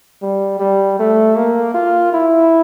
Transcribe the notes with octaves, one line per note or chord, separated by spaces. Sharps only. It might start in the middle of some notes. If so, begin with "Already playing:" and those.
G3
G3
A3
A#3
F4
E4